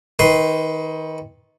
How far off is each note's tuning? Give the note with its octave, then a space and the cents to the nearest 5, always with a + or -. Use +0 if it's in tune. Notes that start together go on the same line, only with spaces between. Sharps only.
D#3 +25 B4 +0 C6 +0